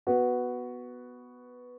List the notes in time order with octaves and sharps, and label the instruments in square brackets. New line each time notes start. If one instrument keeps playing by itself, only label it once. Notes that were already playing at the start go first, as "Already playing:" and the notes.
[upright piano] B3 F#4 B4